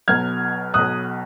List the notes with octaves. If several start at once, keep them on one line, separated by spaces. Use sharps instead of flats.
B1 B2 F#3 F6 G#6
B1 B2 F#3 D#6 F#6